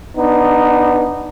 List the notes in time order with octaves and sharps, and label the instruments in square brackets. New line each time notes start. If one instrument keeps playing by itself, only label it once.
[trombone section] B3 D4 D#4